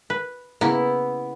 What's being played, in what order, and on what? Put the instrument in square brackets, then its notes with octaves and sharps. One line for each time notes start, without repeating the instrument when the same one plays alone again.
[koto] B4
[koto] C#3 A#3 [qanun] B3 E4